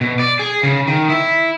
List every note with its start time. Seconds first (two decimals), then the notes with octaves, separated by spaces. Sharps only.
0.01 B2
0.19 D5
0.39 G#4
0.63 C#3
0.87 D#3
1.09 E4